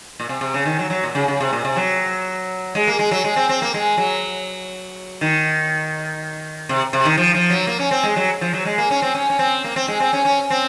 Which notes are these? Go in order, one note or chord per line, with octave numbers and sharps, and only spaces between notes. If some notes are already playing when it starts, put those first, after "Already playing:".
A#2
C3
C3
C#3
D#3
F#3
F#3
A#2
C#3
C#3
C3
A#2
C3
F#3
G#3
A#3
G#3
F#3
G#3
C4
C4
A#3
G#3
F#3
D#3
C3
C3
D#3
F3
F3
F#3
A#3
C#4
C4
G#3
F#3
F3
F#3
G#3
A#3
C#4
C4
C#4
C#4
C4
A#3
C4
G#3
C4
C#4
C#4
C4